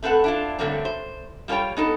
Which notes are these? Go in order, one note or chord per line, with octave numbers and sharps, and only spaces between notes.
A3 C4 A4 B4 F#5
D4 E4 F4
G2 D3 F#3 A3 A#3 C4
C5
G3 F4 A4 C#5 G5
B3 D#4 A4